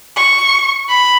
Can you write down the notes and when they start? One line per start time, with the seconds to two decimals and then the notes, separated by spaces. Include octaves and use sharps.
0.16 C#6
0.89 B5